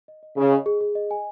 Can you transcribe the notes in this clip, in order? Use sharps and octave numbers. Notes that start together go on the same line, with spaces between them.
D#5
D#5
C#3 G#4
D#5
G#4
G#4
D#5
G#5